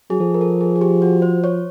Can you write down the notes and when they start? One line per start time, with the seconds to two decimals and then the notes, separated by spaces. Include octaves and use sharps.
0.10 F#3 G#4
0.20 F3 A4
0.34 A#4
0.41 A4
0.61 G#4
0.76 G#4
0.81 G4
1.02 F#4
1.22 C5
1.44 C#5